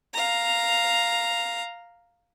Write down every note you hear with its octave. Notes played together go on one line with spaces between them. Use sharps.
F5 A#5